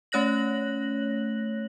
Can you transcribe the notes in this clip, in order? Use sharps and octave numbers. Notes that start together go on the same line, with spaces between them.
A3 C#4 C#5 F#6 A#6 F#7